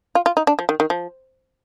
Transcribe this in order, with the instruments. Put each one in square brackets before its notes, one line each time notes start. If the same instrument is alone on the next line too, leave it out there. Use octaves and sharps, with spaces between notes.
[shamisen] F4
F4
D#4
D4
F3
D#3
D#3
F3